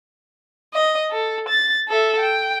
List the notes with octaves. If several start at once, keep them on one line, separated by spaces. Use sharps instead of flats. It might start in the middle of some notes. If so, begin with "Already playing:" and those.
D#5
A4
A6
A4 E5
G5